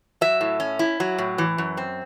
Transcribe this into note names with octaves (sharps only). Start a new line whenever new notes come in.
F#3 E5
A2
C#4
E4
F#3
A2
E3
F#2
C4